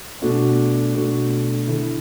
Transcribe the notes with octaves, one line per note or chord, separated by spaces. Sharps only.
B2 A3 D4 F#4
B2 A3 D4 F#4
D3 A3 E4